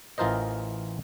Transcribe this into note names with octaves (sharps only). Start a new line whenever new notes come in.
A1 E3 F4 A#4 C5 D#5